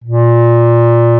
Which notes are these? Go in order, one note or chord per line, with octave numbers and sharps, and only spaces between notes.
A#2